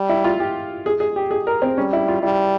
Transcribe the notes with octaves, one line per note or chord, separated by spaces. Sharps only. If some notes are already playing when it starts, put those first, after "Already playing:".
Already playing: G3
E4
F4
G4
G#4
G#4
G4
G#4
A#4
C4
G3 C#4
E4
F4
G3 E4